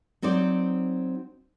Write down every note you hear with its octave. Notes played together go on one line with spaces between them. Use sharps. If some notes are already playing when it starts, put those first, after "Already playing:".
F#3 C4 D#4 C5 D5